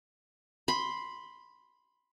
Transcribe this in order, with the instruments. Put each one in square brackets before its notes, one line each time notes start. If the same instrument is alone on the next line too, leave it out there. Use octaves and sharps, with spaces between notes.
[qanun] B5 C6